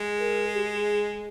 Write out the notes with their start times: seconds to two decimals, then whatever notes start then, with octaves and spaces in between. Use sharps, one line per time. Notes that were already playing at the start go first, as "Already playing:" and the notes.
Already playing: G#3
0.19 A#4
0.47 G#4
0.55 G4
0.63 G#4